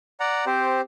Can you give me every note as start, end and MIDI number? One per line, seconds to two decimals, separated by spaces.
0.20 0.45 74
0.20 0.45 78
0.20 0.45 82
0.46 0.81 60
0.46 0.81 67
0.46 0.81 72